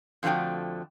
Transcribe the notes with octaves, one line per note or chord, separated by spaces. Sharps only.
F2 D3 F3 A3 F#4 G5